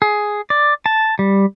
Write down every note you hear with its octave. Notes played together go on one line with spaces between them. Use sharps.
G#4
D5
A5
G3